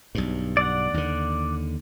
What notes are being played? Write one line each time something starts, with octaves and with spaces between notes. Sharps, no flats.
B1 G2
D5 F#5
D#2 D3